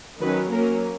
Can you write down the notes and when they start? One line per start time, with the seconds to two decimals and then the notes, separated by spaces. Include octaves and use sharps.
0.21 D#3 F#3 C#4 B4
0.51 F#3 A#3 C#4 A#4